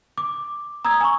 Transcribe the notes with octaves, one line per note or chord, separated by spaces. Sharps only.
D6
A#5 D#6 E6 G#6
G#5 C#6